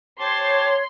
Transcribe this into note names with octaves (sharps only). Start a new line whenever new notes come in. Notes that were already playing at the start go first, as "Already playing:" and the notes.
G4 C5 C#5 A5 C6